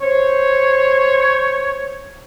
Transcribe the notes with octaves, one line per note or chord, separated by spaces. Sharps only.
C5 C#5